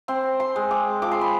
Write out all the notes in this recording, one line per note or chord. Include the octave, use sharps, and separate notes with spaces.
C4 C6
C6
G#3
D6
F3 D6
C6
B5